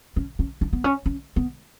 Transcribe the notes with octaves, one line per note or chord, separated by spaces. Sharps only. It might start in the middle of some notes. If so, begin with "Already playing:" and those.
C#4
C#4
D4
B3
C#4
C#4
B3